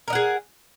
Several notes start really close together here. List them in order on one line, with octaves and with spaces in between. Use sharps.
A#4 D#5 F#5 G#4